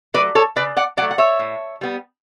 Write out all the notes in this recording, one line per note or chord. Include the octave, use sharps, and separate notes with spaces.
F#3 A3 B4 D5
A4 C#5
C#3 B4 D5
D5 F#5
F#3 D5 F#5
A3
F#5
C#5 E5
A2
G3 B3